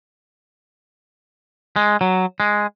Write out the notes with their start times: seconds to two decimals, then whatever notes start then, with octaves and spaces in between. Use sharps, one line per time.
1.76 G#3
2.01 F#3
2.40 G#3